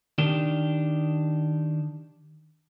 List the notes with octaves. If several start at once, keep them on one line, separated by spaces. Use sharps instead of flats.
D#3 D4 G4